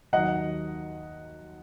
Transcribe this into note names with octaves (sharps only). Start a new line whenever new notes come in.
D#2 D#3 F#3 D#5 F#5